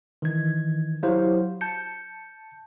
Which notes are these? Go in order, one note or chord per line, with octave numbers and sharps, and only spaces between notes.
D#3 E3 G#6
F#3 E4 G4 C5 F5
A5 G6 C#7